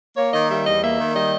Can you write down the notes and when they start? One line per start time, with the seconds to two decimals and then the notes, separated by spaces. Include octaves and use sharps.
0.17 A#3 C#5
0.33 D#3 D#5
0.49 G3 E5
0.65 E2 D#5
0.83 A#3 E5
0.99 D#3
1.15 G3 D#5